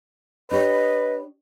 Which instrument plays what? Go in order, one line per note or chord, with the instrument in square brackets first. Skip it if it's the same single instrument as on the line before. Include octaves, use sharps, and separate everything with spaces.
[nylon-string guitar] D4 G4 C#5 [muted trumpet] B4 [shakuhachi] D#5